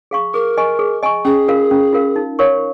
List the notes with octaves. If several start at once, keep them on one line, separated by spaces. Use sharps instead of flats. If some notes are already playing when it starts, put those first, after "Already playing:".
G#4 F5 C#6
G#4 A#4
D#5 G#5 C#6
G#4
D#5 G#5 C#6
C#4 G#4
F4 A#4 F5
C#4
F4 A#4 F5
D#4
A#4 C#5 F5 C#6